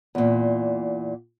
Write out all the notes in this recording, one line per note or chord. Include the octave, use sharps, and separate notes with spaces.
E2 A#2